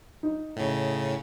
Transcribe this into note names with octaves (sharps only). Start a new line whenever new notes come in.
D#4
A2 C#3